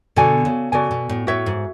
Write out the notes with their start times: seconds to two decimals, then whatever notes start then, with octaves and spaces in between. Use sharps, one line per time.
0.16 B2 D3 F#4 A4 D5 G#5
0.45 C#3
0.72 C#3 F#4 A4 D5 G#5
0.91 B2
1.09 A2
1.27 A2 F#4 C#5 E5
1.46 G#2